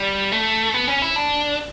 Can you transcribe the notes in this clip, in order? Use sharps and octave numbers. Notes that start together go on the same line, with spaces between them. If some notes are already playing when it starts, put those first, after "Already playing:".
Already playing: G3
A3
B3
C#4
E4
D4